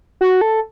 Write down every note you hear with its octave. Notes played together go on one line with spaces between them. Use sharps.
F#4
A4